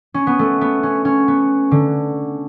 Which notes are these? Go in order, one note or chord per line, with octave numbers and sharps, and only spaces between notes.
C#4
B3
A3
B3
C#4
C#4
B3
D3